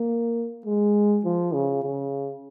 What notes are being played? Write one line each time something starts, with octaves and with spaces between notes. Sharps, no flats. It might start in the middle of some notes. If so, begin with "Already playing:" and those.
Already playing: A#3
G#3
F3
C#3
C#3